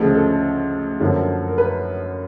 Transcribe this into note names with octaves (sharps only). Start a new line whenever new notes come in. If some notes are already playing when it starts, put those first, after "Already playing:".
Already playing: D2 C#3 F3 G#3 A4
A4
F#2 D3 F3 A#3
A#4
B4